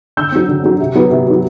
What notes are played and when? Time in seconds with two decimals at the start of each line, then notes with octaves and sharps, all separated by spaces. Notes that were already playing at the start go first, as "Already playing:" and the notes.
0.17 D3 E6 G6
0.32 F#3 C4
0.48 D3
0.63 F#3 C4
0.80 C3
0.95 F#3 B3
1.11 C3
1.27 F#3 B3